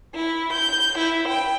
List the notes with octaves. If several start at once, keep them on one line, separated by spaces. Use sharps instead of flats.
E4
G6
E4
G5